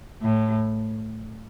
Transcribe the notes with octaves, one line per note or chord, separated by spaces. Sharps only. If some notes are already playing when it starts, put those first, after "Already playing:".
A2